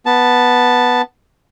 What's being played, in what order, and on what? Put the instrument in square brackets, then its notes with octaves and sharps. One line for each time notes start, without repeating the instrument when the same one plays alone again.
[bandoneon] B3 A5